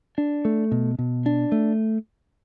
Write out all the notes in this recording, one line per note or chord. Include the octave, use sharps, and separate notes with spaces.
D4
A3
B2
B2
D4
A3